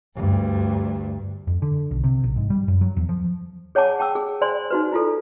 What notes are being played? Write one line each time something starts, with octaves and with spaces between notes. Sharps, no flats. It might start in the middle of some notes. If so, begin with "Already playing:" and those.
D2 G2
F2
D3
B1
C3
A#1
G#2
G3
F#2
F#3
E2
F3
G#4 C#5 F#5 G#5 A5 D6
G5 A5 D6 E6
G#4
C5 D5 G#5 B5 C6
D#4 F#4 B4
E4 F4 A4